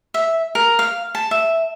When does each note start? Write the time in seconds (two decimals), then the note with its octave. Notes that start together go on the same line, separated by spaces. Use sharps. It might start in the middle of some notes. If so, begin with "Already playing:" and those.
0.14 E5
0.55 A#4
0.79 F5
1.15 A5
1.31 E5